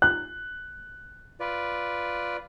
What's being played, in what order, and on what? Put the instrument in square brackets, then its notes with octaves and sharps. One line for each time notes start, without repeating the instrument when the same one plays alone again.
[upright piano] F#6
[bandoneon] F4 B4 D5